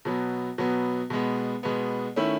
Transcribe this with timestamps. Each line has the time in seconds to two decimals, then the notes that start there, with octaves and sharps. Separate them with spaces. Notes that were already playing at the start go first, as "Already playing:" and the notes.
0.05 B2 F#3 B3
0.58 B2 F#3 B3
1.10 B2 G#3 B3
1.63 B2 G#3 B3
2.16 D#3 A3 C#4 E4